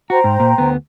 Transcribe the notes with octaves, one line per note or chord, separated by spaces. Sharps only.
F#4 C5 G5 A#5
G#2
A#2
D2 B3